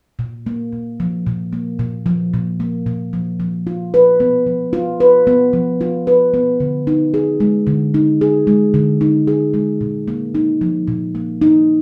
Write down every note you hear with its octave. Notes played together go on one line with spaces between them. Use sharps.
A#2
A#3
A#2
F3
A#2
A#3
A#2
F3
A#2
A#3
A#2
F3
F3
F4
B4
B3
F3
F4
B4
B3
F3
F4
B4
B3
D3
D#4
G#4
G#3
D3
D#4
G#4
G#3
D3
D#4
G#4
G#3
A#2
A#3
D#4
F3
A#2
A#3
D#4